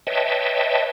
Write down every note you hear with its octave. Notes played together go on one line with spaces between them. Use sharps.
B4 C#5 D#5 E5 G5 A5